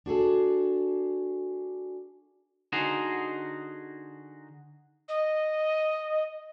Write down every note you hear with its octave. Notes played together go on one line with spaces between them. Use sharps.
D4 F#4 G#4 A4
D3 D#4 F#4 G#4 C5
D#5